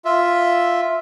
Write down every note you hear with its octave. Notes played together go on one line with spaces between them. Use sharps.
F4 E5